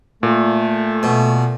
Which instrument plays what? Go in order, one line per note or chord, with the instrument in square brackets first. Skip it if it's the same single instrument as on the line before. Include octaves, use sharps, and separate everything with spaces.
[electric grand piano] A#2 [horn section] A3
[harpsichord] B2